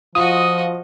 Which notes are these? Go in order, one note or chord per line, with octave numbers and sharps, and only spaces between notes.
F3 F4 F#4 D#5 D#6